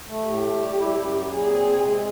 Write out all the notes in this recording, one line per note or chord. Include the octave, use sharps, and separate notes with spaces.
A3
A2 G4
A3
G3
E4
F#2
F#3
A#2 G#4
C4
C3
G#3